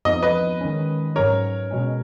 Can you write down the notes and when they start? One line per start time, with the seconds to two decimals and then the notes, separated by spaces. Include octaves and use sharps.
0.05 F2 F3 B3 D#4 D#5
0.22 B4 D#5
0.61 D#3 G#3 C#4
1.16 G#2 F#3 C#4 A#4 C#5
1.71 B2 G#3 C#4